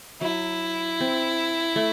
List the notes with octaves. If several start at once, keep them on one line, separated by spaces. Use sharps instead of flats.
F#3 E4
C4
A3